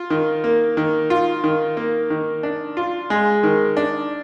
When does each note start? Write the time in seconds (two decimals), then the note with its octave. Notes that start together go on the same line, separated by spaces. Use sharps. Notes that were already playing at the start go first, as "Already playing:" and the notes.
Already playing: F4
0.10 D#3
0.44 A#3
0.77 D#3
1.10 F4
1.44 D#3
1.77 A#3
2.10 D#3
2.43 D4
2.77 F4
3.10 G#3
3.43 D#3
3.77 D4